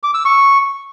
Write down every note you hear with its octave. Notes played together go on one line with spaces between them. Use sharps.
D6
E6
C#6